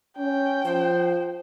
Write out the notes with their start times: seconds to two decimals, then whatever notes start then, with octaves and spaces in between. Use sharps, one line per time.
0.17 C#4 G5
0.65 F3 C5